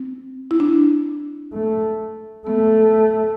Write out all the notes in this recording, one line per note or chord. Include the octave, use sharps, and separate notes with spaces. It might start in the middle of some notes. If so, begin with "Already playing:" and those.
Already playing: C4
E4
D4
A3
A3 B3